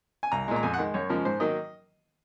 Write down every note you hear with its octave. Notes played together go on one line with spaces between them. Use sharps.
G#5
C2 A#5
A#2 G#3
A#5
F2 G#5
F#5
D#3 G#3
F#2 C#5
C#3 F3 G#3 A#4
G#2 C5
D#3 F#3 A#3 D#5